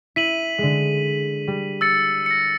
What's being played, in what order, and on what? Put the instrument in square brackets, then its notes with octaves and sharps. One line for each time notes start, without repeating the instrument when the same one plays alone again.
[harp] E4 [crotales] B6 D#7 F#7
[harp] D3 G#3
G3
[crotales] E6 A6 C#7
A#6 C#7